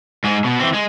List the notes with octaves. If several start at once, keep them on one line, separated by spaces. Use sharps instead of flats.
G#2 G#3
B2
E3 C4
G#3